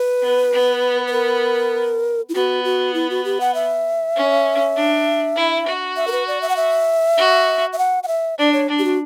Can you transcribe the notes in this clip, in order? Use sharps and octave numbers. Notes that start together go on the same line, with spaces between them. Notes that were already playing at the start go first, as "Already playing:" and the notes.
Already playing: B4
B3
B3
B4
A#4
E4
B3 F#4
F#4
E4
F#4
G4
F#5
E5
C#4
D4
E4
F#4
E5
A#4
B4
D5
E5
F#5
E5
F#4
E5
F#5
F#5
E5
D4 D5
C#5
D4
G4
F#4